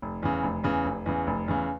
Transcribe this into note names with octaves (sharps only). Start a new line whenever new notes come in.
F1
E2 C#3
F1
E2 C#3
F1
E2 C#3
F1
E2 C#3